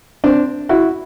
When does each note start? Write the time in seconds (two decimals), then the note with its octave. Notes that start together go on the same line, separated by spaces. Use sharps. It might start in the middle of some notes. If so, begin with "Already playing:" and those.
0.24 C4 D4
0.69 E4 F#4